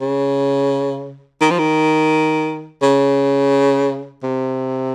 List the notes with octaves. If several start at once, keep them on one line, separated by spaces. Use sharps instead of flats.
C#3
D#3
F3
D#3
C#3
C3